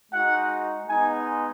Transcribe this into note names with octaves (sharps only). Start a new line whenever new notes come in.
G#3 D#4 F#4 F#5
G#3 B3 D#4 G#5